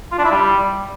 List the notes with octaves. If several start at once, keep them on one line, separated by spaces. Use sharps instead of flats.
F4
D4
E4
G3